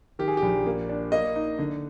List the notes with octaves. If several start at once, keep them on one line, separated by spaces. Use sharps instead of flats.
D#3 G4
G#4
G4
A#1
A#3
D4
A#3 D#5
D#4
D3